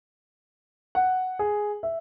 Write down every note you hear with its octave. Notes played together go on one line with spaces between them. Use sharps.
F#5
G#4
E5